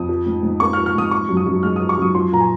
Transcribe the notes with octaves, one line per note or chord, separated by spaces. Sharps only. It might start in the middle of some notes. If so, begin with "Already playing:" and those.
Already playing: F2 D#6
F3
G#2
G#2
A#3 C#6
F6
F3
F6
G#2 D#6
F3 C#6
F#2
D#6
F#2
G#3 F6
F3 D#6
C#6
F#2 D#6
F3 C6
A#2 A#5
G#5